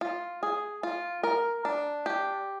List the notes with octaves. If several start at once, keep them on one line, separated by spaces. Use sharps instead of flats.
F4
G#4
F4
A#4
D4
G4